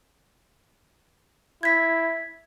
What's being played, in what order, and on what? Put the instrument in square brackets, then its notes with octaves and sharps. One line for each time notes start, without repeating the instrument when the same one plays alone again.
[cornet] E4 [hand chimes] G#6 B6